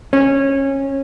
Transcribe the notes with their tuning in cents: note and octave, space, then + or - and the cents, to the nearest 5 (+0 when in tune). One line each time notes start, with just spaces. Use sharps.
C#4 -20